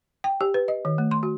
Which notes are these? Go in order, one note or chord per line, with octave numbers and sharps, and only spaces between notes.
G5
G4
B4
D#5
D#3
A3
C6
F#4